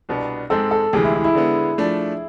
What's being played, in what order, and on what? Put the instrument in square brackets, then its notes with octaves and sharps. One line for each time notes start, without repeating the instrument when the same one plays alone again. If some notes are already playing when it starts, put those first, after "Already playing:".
[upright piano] C2 B2 B3 D4
[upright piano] G#2 G#3 C4 [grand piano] A4
[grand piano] A4
[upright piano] D2 C3 E3 G#3 [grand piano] G#4
[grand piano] E4
E4
E4
[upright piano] D3 G#3 B3
F3 A3 D4